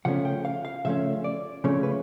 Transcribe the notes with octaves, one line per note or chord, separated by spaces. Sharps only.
C#3 F3 A3 C#4 F#5
G5
F5
F5
C#3 F3 A3 C#4 E5
D5
C#3 F3 A3 C#4 C#5
B4